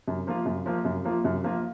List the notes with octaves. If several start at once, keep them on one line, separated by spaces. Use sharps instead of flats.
F#2
F3 A#3 F4
F#2
F3 A#3 F4
F#2
F3 A#3 F4
F#2
F3 A#3 F4